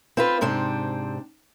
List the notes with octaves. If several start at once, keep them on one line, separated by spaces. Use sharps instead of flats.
C4 F4 B4
G#2 C3 C4 D4